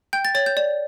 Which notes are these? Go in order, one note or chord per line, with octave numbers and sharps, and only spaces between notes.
G5 G6
A6
C#5 A6
G6
D5